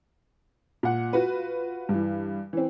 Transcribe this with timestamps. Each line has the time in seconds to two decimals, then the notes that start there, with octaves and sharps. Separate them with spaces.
0.83 A#2 F#5
1.13 F4 F#4 B4
1.89 G2 E3
2.53 E3 C4